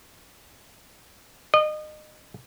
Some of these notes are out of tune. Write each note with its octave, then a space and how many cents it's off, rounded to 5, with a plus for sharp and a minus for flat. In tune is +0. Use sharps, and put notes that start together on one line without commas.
D#5 -30